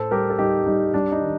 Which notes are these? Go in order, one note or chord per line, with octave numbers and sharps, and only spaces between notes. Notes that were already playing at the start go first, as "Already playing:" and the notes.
Already playing: A2 A4 C5
G3 G4 A#4
A4
G3 D#4 G4
G3 D#4
G3 D4
D#4
D#3